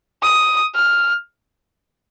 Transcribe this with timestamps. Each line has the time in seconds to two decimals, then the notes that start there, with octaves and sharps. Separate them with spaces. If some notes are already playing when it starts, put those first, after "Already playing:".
0.23 D#6
0.75 F6